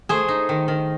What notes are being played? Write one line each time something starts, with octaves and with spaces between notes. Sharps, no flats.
A3 G#4 C5
D#4
D#3
D#3